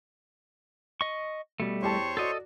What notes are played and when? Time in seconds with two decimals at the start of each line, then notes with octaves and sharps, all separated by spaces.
1.01 D#5 C#6
1.60 B2 G3 A3
1.82 E2 G4 C5 C#5 A5 C#6
2.17 F#4 A4 D5 D#5